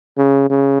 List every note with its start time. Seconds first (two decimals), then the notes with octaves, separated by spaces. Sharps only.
0.18 C#3
0.50 C#3